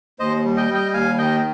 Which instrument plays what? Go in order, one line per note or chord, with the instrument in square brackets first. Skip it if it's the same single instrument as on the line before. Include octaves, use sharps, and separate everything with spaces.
[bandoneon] D#2 C5 D#5
G3
D#5 G5
G3
D#5 G5
D#2 F5 G#5
D#3 D#5 G5